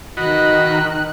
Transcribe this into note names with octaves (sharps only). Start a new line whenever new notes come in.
D#3 F#4 D#5 B5 F#6